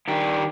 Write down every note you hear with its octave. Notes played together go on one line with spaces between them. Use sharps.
D#3 G3 D4 G4